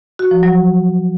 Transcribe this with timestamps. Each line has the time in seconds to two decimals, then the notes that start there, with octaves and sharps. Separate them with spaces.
0.19 F#4
0.31 F3
0.43 F#3